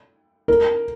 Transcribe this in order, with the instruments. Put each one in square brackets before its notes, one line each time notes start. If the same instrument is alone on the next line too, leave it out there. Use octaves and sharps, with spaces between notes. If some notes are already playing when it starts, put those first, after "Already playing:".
[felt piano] A#4